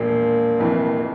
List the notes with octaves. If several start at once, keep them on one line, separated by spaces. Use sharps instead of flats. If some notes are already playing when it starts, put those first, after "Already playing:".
Already playing: E1 A#2 F3
F1 F2 E3